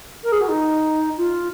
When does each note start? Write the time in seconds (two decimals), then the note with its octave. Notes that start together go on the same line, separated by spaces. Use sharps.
0.23 A#4
0.31 G#4
0.40 F#4
0.48 D#4
1.17 F4